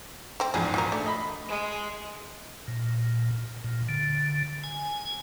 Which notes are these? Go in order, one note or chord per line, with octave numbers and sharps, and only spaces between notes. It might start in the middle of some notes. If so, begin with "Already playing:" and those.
A3 C4
A#1 E2 G#2 G#4
F4 F#4 A#4
A3 D4
D#5 B5
G#3
A#2
A#2
D3
G#5